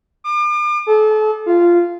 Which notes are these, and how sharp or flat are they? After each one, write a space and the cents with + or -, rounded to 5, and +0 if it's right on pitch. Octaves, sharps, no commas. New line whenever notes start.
D6 +40
A4 -35
F4 -10